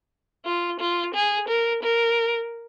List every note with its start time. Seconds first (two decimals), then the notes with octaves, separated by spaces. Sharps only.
0.45 F4
0.80 F4
1.14 G#4
1.48 A#4
1.83 A#4